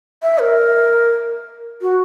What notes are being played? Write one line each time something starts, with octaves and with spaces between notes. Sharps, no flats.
E5
A#4
F#4